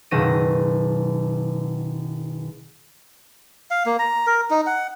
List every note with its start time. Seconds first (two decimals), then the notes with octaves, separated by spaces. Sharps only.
0.11 F#1 B2 D#3 E6 A#6 D#7
3.71 F5
3.86 A#3
3.99 A#5
4.27 A#4
4.50 D#4
4.66 F#5